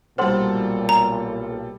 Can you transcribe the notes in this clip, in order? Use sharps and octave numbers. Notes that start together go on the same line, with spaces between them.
B1 A#2 G3 A4 C5 F#5 C6
A#5